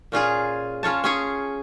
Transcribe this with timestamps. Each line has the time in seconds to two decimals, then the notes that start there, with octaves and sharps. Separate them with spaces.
0.12 A#2 C#4 F4 G#4
0.83 C#4 F4 C#5 A5
1.04 C#4 G#4 C#5